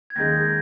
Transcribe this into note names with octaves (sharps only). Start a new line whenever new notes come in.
G#6
D#2 D#3 G#3 G6 A#6